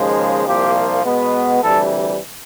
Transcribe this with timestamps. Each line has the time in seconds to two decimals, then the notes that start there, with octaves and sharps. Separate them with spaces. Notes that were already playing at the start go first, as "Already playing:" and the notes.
Already playing: D#2 C#3 F3 G#3
0.45 C2 A#2 F3 A#3 G4
1.04 B2 G#3 B3
1.61 D2 C3 E3 G3 A4